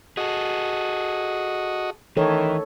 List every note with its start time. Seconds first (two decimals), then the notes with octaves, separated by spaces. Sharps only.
0.17 F#4 G#4 A4 D#5
2.17 D#3 E3 A4 C#5